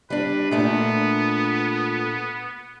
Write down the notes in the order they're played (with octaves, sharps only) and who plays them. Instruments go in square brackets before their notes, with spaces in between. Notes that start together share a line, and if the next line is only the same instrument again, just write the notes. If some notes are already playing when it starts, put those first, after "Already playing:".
[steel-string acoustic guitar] G3 D4 [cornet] B4
[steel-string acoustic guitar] A#2 A3 D4 [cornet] B3